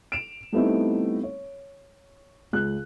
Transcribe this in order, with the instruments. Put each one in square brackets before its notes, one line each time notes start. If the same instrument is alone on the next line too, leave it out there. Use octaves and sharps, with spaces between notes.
[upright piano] D7 E7 F7
G3 A3 B3 C4 D#4 E4
C#5
C#2 F#6